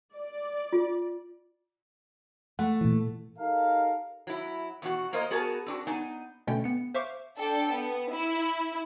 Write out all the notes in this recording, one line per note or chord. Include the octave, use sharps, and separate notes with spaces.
D5
F4
A3 F#5
A#2 E3
D#4 G4 A4 A#4 F5
F#3 E4
E2 B2 F#4
A#3 A#4 C5 C#5 D#5
B3 F#4 G#4 A#4 A5
C4 D4 F#4
B3 D#4 G#5
B2 D3 A3 C#4 G5
B3 C#7
C5 E5 F5 C#6 D6
D4 A4 G5
B3
E4